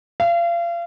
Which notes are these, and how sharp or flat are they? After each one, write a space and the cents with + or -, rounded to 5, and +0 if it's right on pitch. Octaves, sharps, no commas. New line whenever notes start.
F5 -35